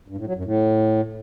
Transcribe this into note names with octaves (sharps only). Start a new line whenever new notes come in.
G2
A2
F#3
F#2
A2